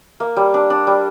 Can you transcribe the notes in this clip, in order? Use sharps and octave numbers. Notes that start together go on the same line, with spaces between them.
A#3
G3
D4
D4
G3